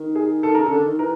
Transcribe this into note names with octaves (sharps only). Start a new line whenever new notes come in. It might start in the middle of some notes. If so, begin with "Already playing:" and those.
Already playing: D#3
G#4
D#3 A4
C#3 A#4
A4
D3
D#3
E3 A#4